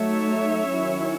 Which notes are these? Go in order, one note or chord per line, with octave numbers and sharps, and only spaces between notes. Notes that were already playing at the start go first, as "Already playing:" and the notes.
Already playing: F#3 A3 D#4 C#5 E5
D#3 F#3 C#4 E4